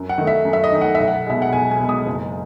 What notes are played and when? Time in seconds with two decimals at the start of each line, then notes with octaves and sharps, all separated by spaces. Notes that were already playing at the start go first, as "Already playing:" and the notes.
Already playing: F#2
0.09 F#5
0.18 D#3 A3 D#4
0.27 E5
0.45 F#2
0.53 E5
0.64 D#5
0.72 D#3 A3 D#4
0.81 F#5
0.95 B1 E5
1.08 F#5
1.27 B2 G#3 E5
1.42 F#5
1.53 B1 G#5
1.71 G#5
1.80 B2 G#3
1.89 D#6
2.06 F#1